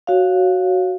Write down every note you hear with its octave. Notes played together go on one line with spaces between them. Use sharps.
F#4 C#5 F5